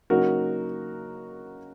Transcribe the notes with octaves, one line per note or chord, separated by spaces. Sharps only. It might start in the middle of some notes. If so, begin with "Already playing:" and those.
C#3 F#3 A#3 D#4 F#4 A#4